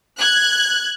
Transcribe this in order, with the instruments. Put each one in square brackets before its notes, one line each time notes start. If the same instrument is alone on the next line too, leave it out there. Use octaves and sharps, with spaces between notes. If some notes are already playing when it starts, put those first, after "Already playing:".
[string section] F#6 G#6